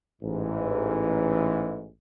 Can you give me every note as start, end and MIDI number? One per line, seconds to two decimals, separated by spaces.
0.22 1.87 33
0.22 1.87 44
0.22 1.87 52